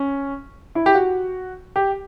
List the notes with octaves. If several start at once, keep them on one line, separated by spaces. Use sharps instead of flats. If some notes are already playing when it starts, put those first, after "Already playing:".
Already playing: C#4
E4
G4
F#4
G4